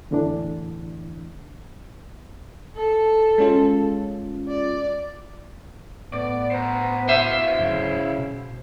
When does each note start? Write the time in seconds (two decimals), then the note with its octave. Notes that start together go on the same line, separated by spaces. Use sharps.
0.11 E2 A2 D3 E3 D4
2.75 A4
3.38 G#3 C#4 F4
4.48 D5
6.13 A2 B3 D5
6.51 C5 A#5
7.09 E4 C5 E5 F5
7.59 D2 G#2 C#3 F#3
8.18 B2